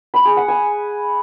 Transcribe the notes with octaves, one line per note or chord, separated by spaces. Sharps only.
B5
G#4
F#5
G#5